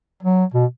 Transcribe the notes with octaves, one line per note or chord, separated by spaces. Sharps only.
F#3
B2